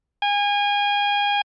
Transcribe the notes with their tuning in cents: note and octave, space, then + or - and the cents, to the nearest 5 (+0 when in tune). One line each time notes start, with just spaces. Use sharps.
G#5 -30